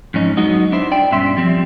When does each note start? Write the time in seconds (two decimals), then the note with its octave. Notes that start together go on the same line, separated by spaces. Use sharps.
0.14 F2 G#2 C#4 D#4
0.37 F#3 G#3 B3 D#4 F#4 D#5
0.72 D4 E4 C5
0.92 D5 G5
1.11 G2 B2 C#4 E5 C6
1.37 F3 G3 C4